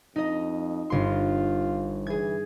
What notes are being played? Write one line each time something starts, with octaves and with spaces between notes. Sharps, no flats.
F2 D#4 D#5
G1 F4 C6
E3 G#4 G#6